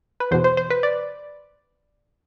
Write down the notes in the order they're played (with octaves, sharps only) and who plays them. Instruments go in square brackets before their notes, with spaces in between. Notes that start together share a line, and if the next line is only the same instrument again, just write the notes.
[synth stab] B4
E2 B2 C5
C5
C5
B4
D5